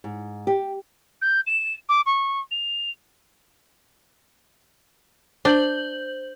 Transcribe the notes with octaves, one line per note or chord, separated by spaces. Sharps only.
G#2
G4
G6
E7
D6
C#6
F7
D4 C5 G6 F#7